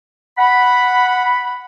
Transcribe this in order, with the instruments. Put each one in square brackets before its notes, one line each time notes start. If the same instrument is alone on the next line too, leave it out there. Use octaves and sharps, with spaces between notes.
[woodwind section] F#5 B5